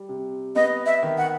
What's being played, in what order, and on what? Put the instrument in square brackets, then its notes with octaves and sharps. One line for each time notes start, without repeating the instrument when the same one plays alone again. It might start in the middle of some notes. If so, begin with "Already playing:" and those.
Already playing: [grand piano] G3
C3
[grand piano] B3 [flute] D#5
[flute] E5
[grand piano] D#3
[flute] F#5